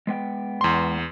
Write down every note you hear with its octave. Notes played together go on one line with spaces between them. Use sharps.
G#3 B3 G5
E2 C6